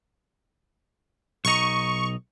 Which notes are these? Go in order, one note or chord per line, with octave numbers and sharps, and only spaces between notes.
B1 D#4 C#6